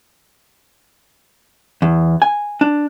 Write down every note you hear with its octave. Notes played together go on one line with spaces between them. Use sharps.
E2
G#5
D4